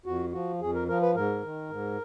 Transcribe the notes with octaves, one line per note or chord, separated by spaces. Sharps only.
F2 F#4
F3 F#4
F2 G#4
A#4
F3 A#4
B4
G#2 A#4
D#3
G#2